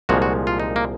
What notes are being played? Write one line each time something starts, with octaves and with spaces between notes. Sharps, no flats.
C2 A#2 F3 G#3 F#4
F#4
F4
D#4
A#3